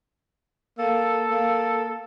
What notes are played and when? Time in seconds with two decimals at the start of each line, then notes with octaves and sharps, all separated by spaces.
0.78 A#3 A4
1.31 A#3